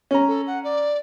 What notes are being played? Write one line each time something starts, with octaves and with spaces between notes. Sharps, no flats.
C#4 A#5
A4
F#5
D5